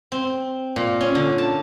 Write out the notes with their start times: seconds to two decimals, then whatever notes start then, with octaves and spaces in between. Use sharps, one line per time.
0.12 C4
0.76 A#2
1.01 C#4
1.15 D3
1.38 A5